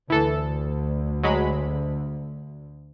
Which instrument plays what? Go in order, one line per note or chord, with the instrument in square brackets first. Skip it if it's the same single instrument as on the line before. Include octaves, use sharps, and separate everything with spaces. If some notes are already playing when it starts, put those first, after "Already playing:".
[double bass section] D2 [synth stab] E3 A4
[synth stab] F#3 G#3 B5